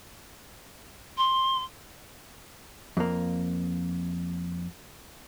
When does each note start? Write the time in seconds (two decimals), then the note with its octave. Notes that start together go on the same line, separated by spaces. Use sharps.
1.17 C6
2.97 F2 A#3